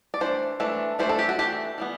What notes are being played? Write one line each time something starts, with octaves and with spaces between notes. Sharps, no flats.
D5
E3 A3 D4 C5
E3 A3 D4
E3 A3 D4 C5
A4
G4
F#4
E3 A3 D4 G4
E3 G3 B3